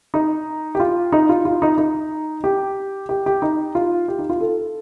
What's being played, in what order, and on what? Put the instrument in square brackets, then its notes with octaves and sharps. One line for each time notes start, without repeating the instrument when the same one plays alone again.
[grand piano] D#4
G4
F4
D#4
F4
F4
D#4
D#4
G4
G4
G4
D#4
F4
G4
D#4
F4
A4